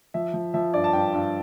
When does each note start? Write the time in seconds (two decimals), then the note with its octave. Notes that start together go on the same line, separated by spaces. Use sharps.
0.14 F3 E5
0.34 F3
0.54 F3 E5
0.74 G2 D5
0.84 A5
0.93 G2 G5
1.13 G2